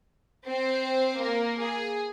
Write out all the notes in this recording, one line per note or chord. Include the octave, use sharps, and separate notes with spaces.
C4 C5
A#3 A#4
G#4